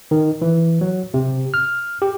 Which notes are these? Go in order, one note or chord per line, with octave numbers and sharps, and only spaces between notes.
D#3
E3
F#3
C3
F6
G4